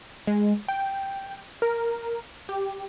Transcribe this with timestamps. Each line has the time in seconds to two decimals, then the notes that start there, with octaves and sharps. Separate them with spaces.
0.27 G#3
0.68 G5
1.62 A#4
2.49 G4